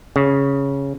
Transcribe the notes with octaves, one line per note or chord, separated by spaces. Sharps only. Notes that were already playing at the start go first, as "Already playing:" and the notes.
C#3